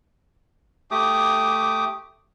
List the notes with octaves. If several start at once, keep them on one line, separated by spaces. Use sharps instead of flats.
A3 G4 D6 D#6